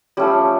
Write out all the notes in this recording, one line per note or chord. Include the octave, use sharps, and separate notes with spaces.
F3 G3 A3 C#4 G4